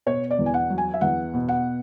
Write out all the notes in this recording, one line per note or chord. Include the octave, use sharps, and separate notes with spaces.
B2 C#5
D5
E2
G#5
F#5
F#3
G#5
E5
E2 F#5
B2
F#5